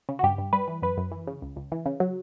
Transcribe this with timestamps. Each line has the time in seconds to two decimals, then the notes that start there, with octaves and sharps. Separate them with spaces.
0.09 C#3
0.19 F#4
0.23 G2 G4
0.38 G2
0.53 G3 B4
0.68 E3
0.82 F#2 B4
0.97 F#2
1.12 E3
1.27 C#3
1.42 C#2
1.56 C#2
1.72 E3
1.86 C#3
2.00 F#3